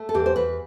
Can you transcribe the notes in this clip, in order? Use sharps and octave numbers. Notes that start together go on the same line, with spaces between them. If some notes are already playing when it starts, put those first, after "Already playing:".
Already playing: A3
A4
E2 G4
C5
E2 B4